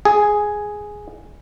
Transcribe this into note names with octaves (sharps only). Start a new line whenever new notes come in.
G#4